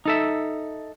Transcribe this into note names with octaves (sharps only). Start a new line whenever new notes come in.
D#4 A4 E5